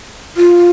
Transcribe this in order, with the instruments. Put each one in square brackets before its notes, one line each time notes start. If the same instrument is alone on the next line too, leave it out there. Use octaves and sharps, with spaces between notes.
[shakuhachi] F4